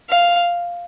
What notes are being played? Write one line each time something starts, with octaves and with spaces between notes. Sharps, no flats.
F5